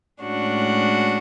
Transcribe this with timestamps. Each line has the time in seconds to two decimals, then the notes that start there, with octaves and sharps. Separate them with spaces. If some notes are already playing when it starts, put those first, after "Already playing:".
0.23 A2 G#3 C#4 D4 F#4